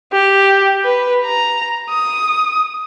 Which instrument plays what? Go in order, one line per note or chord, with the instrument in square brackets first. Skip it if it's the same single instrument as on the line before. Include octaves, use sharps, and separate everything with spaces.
[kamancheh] G4
B4
A#5
D#6